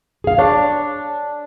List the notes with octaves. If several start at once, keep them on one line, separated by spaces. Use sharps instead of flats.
G#4 F5
D4 C#5